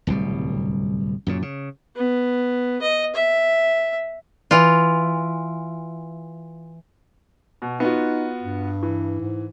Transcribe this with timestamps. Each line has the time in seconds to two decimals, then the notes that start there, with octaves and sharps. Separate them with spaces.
0.07 D1 C2 B2 G3
1.27 F#2 A#2 C#3
1.42 C#3
1.96 B3
2.82 D#5
3.15 E5
4.51 E3 F4
7.62 B2
7.80 B3 D#4 F4 F#4
8.43 G2
8.82 E3
9.20 G#2